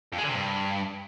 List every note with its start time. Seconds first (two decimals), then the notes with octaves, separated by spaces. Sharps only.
0.13 F2
0.18 G#3
0.23 D3
0.29 C3
0.34 G2